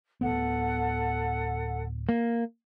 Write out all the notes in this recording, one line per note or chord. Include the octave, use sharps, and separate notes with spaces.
D1 G#1 B3 A4 F#5
A#3